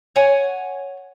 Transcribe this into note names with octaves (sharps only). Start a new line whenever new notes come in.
C#5 F#5 G#5